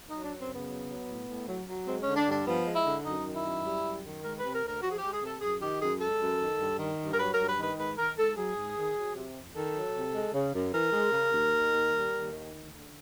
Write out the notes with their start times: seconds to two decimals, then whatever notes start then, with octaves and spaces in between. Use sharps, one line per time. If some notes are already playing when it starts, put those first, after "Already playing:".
0.09 F#3 D#4
0.23 D4
0.28 F#2
0.39 C4
0.48 C#3
0.54 B3
0.68 F#3
0.89 F#3
1.07 A2
1.27 A2
1.48 F#3
1.67 F#3
1.87 G#3 C4
2.01 C#4
2.06 D3
2.16 D4
2.26 G2 D4
2.46 F3 B3
2.65 G#3
2.75 E4
2.85 D3
3.04 F#2 D#4
3.25 D#3
3.35 E4
3.45 F#2
3.64 G3
3.84 F#2
4.04 D#3
4.23 G#3 A#4
4.38 C3 B4
4.52 A#4
4.63 D2
4.68 A#4
4.82 F3 F#4
4.91 G#4
4.97 G#3 G4
5.12 G#4
5.22 C3 A4
5.41 F#2 G#4
5.61 D#3 G4
5.80 F#2 G#4
6.00 G#3 A4
6.20 F#2
6.40 D#3
6.59 G2
6.79 D#3
6.98 G2
7.13 A#4
7.19 F#3 B4
7.33 A#4
7.38 G2
7.47 B4
7.58 D#3 B4
7.77 G#2 B4
7.98 D#3 A#4
8.17 G#2 A4
8.37 F#3 G#4
8.56 G#2
8.76 D#3
8.96 F#3
9.15 C3
9.35 F2
9.55 D#3 A4
9.75 F#3
9.94 C3
10.15 G#3
10.33 C#3
10.54 F#2
10.73 E3 A#4
10.93 G#3
11.12 C#3
11.32 D#2
11.52 D#3
11.71 D#2
11.91 G3
12.12 D#2
12.31 D#3
12.51 D2
12.70 D3